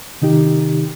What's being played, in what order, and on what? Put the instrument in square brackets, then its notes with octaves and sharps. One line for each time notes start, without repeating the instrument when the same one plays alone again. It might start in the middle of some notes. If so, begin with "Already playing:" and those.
[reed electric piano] C3 D#3 D#4 G4